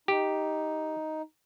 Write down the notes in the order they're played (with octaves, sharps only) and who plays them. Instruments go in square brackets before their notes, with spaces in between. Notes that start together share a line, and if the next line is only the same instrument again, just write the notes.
[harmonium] D#4 [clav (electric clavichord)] G4